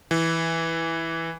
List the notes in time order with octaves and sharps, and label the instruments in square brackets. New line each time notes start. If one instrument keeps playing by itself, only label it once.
[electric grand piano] E3